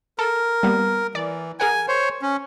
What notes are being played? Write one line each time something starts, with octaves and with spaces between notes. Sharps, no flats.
A4 A#4
G3 A#3 B3
E3 D5
G#4 A#4 F#5 G#5
C5 C#5
C#4